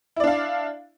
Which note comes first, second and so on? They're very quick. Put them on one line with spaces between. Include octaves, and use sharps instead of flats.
E4 D5 D4 F5